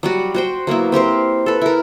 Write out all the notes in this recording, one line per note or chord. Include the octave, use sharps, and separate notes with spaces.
F#3 G3 F#4
F#4 C5 G5
F#3 A#3 B3 E4
C4 G4 A#4 C5
A4 B4
E4 A#4